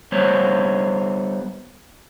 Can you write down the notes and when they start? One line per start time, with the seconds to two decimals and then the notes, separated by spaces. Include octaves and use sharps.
0.12 G3 B3 C5 C#5